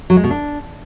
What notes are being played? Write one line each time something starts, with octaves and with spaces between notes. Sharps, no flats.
F#3
G#3
B2
D4